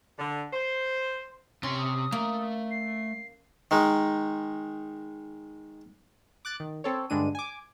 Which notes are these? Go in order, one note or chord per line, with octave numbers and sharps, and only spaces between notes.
D3
C5
C3 C#4 C6
D#6
A3 A#3
C7
D#3 G#3 D#4
D6 F#6 A6
D#3
C4 A4 C#5
G2 D3 G#3 D4 D#7
G#5 D6